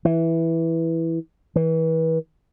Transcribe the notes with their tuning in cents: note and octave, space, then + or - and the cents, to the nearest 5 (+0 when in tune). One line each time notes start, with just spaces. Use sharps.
E3 -5
E3 -30